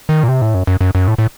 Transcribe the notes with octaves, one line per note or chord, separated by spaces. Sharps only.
D#3
A#2
C3
A2
F#2
F#2
F#2
F#2
A2
A2